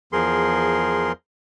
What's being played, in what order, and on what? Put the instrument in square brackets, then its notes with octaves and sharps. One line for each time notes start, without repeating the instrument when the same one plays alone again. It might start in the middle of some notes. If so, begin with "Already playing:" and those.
[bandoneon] E2 F3 G#4 A#4 C6